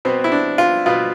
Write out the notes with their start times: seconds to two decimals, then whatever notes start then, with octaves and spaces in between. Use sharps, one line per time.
0.05 B2 B3 C4
0.24 E4
0.32 D4
0.58 F4
0.86 B2 B3 F4